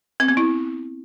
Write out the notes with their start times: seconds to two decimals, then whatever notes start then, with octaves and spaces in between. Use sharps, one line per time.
0.20 C4
0.28 B3
0.37 E4